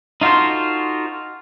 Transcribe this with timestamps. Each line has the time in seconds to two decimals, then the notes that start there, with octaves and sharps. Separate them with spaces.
0.21 D#4 F4 F#4 A4 C5